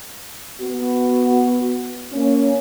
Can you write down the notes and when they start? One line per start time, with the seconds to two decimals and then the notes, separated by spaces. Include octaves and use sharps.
0.61 B3 F#4
2.13 A#3 C#4